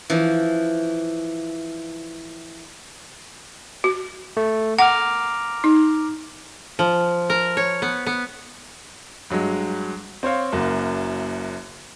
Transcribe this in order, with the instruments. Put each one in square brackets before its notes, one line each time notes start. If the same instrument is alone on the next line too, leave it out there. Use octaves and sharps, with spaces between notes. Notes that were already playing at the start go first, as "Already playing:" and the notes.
[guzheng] E3 F3
[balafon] F#4
[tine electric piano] A3
[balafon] F#5 [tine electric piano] A#5 D6 F6
[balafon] D#4
[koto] F3
A#4
C#5
B3
B3
[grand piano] G2 F#3 G#3
C4 C5 C#5 F5
F#1 F#2 A#3